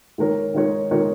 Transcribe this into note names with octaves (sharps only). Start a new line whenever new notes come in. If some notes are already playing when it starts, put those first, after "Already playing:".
D#3 G#3 D#4 A#4 C#5
D#3 G#3 D#4 A#4 C#5
D#3 G#3 D#4 A#4 C#5